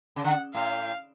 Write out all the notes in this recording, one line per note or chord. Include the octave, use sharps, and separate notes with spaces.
C#3
D3 F#5
A2 F5